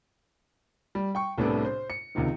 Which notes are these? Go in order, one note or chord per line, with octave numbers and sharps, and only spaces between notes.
G3
G5 C#6
C2 A2 C3 B3 D4 A4
C5
C#7
C#2 C3 D#3 F3